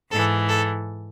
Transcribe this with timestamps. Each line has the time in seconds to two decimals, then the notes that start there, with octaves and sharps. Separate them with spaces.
0.10 G#2 E3 A4
0.47 A4